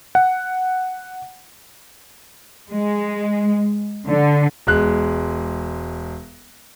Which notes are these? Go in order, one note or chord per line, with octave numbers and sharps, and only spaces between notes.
F#5
G#3
D3
E1 G#3 F#6